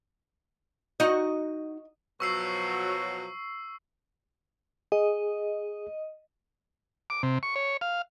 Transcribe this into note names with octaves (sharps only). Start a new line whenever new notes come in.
D#4 F#4 D#5
B2 F3 F#3 C#6 E6 C7
G#4 D#5
D6
C3
C#6
C#5
F5